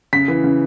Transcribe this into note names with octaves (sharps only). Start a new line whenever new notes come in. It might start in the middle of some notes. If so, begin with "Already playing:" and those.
C#3 B6
E3
C#3